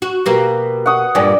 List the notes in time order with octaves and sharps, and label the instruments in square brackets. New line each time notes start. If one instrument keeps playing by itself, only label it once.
[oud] F#4
[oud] B2 A#3 G4 [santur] B4
[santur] F#5 C#6 D#6
[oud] G2 A#2 [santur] D5 G5 G#5